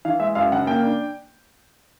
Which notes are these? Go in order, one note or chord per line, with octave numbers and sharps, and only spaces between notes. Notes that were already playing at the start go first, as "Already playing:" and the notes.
E3 F5
G#3 E5
F#2 F5
C#3 F#5
A#3 G5
D4